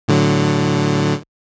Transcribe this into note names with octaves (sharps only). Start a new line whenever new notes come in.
A2 D3 F#3